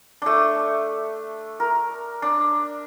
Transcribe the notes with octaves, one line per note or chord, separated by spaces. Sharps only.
A3 D4
A#4
D4